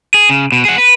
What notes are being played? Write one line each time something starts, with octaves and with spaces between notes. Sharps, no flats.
G#4
C#3
B2
G#4 F#5
B4